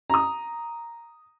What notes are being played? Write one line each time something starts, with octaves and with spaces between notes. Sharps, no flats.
A#5 D#6